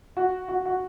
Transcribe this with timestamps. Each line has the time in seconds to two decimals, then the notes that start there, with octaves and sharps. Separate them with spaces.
0.17 F#4
0.48 F#4
0.66 F#4